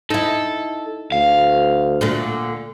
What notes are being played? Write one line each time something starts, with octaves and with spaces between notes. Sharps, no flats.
D#4 E4 A4
D2 F5
A#2 D3 A3